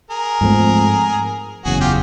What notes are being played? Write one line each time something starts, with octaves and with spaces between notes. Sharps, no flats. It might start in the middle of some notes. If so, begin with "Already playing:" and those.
G#4 A#4
G#2 F3 A3 C4
F#1 E2 C#3 F#4 G#4
F4 G4